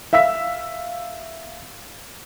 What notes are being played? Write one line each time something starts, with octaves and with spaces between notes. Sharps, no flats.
E5 F5 E6 B6